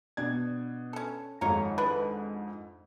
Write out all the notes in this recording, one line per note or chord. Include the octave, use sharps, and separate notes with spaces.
B2 D4 G#6
C#4 A4
G#1 F2 G#2 F4 C#5 A#5
D4 E4 B4